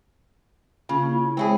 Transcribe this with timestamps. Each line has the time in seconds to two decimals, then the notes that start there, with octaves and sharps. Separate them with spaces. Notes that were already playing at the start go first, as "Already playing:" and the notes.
0.89 C#3 A#3 F4
1.12 E4
1.37 G#3 C4 E4 G#4 C#5